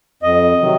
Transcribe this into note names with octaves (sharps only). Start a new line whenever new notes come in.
F2 D#5
C3 D#3 F#3